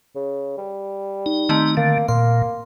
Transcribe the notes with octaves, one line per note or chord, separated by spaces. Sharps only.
C#3
G3
D#4
D#3 A3 C4
D3 A#3
A#2 A#3 C6